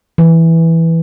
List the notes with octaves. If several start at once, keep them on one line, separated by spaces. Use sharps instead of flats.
E3